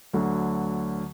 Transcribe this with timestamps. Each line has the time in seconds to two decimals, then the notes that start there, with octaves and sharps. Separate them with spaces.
0.13 D2 D3 F#3